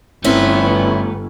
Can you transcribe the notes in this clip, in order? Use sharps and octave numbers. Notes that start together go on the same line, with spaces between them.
G1 A3 C4 C#4 E4 B4